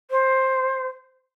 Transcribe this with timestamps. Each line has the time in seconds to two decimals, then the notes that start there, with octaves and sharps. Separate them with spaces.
0.11 C5